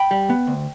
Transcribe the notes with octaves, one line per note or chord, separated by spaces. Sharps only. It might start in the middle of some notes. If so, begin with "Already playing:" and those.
Already playing: G5 B5
G3
B3
D2